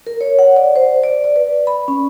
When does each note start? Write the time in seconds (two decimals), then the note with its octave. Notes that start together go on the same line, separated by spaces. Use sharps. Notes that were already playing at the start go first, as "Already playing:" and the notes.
0.07 A#4
0.21 C#5
0.39 F#5
0.57 D5
0.76 C5
1.03 D5
1.24 D5
1.36 B4
1.67 B5
1.88 C#4